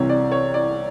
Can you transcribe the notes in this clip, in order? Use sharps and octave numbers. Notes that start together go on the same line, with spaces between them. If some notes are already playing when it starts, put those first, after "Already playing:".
Already playing: C2 C3 E3 C#5
D5
C#5
D5